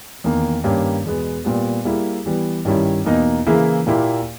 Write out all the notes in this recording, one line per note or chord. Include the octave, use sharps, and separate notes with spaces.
E2 D#3 A#3
G2 D#3 A#3 C#4 G4
E2 B2 G#3 B3
A#2 G3 B3
G3 A#3 E4 G#4
E3 G3 B3
G2 D#3 G3 C#4 E4
E2 B2 A#3 D#4
C#3 E3 A#3 E4 G#4
A#2 A#3 E4 G4